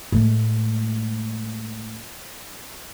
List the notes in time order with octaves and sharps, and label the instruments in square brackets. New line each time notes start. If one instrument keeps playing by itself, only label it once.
[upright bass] A2 G#3